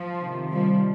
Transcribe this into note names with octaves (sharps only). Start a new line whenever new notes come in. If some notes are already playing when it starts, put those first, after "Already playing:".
Already playing: F3
C3 D#3
F3 G3